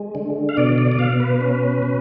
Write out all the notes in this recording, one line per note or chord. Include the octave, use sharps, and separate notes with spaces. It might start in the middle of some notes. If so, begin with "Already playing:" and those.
Already playing: G#3
D3
F5
B2 D5
D5
D5
B2 F5
B4
C#4
B2